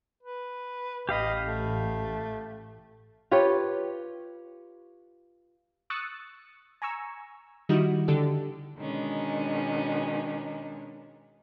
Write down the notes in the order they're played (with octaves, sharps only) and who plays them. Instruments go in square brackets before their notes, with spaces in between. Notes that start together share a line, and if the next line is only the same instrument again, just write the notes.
[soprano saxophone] B4
[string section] A1 [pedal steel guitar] G4 F5 B5 [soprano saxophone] D#5
[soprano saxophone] A3
[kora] F4 G4 B4 C#5
[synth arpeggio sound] C#6 D#6 E6 F#6 A6 C#7
G#5 A#5 C#6 E6
D#3 G3 D#4 E4 F#4 D#5
D3 D4 G4 A4
[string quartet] B2 D#3 G#3 C#4 D4